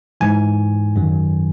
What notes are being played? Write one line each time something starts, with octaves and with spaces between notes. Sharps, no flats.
G#2 E3 G#5
F#2 D#3 F#3